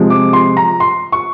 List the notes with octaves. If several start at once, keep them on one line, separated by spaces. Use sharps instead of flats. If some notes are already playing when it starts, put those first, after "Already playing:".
Already playing: C3 F3 G#3
D6
C6
A#5
C6
C#6